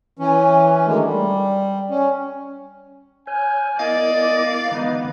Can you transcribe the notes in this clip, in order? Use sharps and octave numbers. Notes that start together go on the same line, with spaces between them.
E3 C#4
D#3 F#3 G#3 A3 D4
G3
C#4
C#5 G#5 F6 G6
B3 E4 A#4 D5 D#5 F5
D3 E3 G#3 B3 D#4